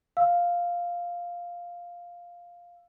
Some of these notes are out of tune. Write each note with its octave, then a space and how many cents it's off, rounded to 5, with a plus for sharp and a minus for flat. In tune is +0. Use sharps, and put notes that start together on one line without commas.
F5 +0 E6 +5